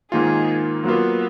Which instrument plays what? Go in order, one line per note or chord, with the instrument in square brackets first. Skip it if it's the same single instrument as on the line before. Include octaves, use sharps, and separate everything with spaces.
[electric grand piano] G#2 D#3 A#3 F4 [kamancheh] G#4
[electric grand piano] F#3 A#3 F4 [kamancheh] B3